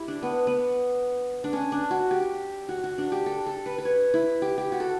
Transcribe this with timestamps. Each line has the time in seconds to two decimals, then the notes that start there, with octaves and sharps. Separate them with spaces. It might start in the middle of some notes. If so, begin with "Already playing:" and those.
Already playing: E4 G4
0.08 D4
0.23 B3
0.47 B3
1.44 D4
1.53 C#4
1.72 D4
1.91 F#4
2.11 G4
2.69 F#4
2.84 F#4
2.98 D4
3.12 G4
3.26 A4
3.46 A4
3.66 B4
3.78 B4
3.85 C#5
4.14 E4
4.42 G4
4.58 G4
4.72 F#4
4.80 A4